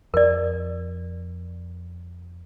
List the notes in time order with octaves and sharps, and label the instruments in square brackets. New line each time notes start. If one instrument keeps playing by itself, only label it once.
[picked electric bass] F2 [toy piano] A#4 D5